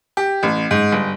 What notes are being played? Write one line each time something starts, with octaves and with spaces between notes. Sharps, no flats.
G4
A1
G#2
G1